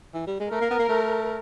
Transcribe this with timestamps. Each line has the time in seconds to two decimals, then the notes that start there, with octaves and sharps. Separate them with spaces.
0.14 E3
0.27 G3
0.40 G#3
0.51 A3 A#4
0.61 A#3
0.70 B3
0.79 A#3
0.89 A3